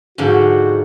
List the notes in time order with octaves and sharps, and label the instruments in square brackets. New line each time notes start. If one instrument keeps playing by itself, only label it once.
[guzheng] G#2 D3 F3 [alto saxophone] F#4